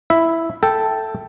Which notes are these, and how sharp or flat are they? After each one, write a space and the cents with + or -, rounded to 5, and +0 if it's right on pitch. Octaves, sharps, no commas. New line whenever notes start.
E4 +0 E5 +0
A4 +0 G5 +0